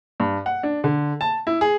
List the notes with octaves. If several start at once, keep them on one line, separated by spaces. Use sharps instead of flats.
G2
F#5
D4
D3
A5
E4
G#4